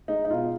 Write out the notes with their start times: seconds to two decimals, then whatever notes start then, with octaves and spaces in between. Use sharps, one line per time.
0.08 G#3 D#4
0.25 D#4
0.31 B2 F4